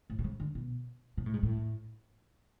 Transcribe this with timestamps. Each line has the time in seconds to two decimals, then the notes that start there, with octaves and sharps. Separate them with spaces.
0.10 A2
0.19 B2
0.24 C#3
0.40 D3
0.55 B2
1.17 B2
1.26 A2
1.34 G#2
1.43 A2